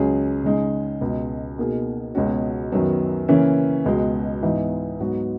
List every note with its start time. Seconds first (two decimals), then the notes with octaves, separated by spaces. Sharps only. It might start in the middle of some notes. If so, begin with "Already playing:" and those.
Already playing: C#2 C#3 F#3 C#4 G#4
0.43 C#3 G#3 D#4
1.01 C#2 B2 G#3
1.58 B2 A#3 D#4 G#4
2.15 C#2 B2 G#3 C#4 F#4
2.72 F#2 D#3 F#3 B3
3.28 C#3 E3 A#3 C#4
3.85 C#2 B2 G#3
4.43 G#2 E3 B3 D#4
5.00 G#2 F#3 B3 D#4 F#4